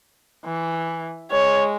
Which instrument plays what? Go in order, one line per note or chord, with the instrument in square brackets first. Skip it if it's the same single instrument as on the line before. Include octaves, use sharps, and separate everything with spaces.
[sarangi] E3
[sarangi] G#3 [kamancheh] C#5